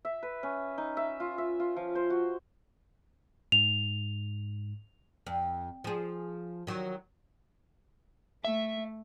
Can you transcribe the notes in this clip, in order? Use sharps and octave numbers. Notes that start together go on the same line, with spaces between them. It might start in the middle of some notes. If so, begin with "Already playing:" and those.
E5
B4
C#4
D#4
E5
F4
E5
F4
F3
C5
F#4
G#2 F7
F2
F3 G#4
D#3 F#3
A3 E5